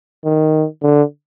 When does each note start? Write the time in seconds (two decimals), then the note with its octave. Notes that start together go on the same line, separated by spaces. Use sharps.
0.25 D#3
0.82 D3